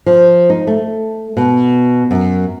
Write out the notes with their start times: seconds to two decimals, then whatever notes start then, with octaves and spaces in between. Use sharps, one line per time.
0.06 F3
0.50 D#4
0.67 A3
1.37 B2
2.11 F#2